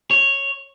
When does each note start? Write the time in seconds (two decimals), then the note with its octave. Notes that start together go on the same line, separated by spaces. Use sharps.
0.11 C#5